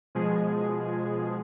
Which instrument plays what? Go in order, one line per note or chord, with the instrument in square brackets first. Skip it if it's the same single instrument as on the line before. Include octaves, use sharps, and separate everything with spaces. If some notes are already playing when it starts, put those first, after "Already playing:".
[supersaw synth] B2 F3 G#3 G#4